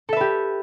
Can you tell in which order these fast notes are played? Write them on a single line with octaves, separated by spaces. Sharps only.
A4 E5 B4 G4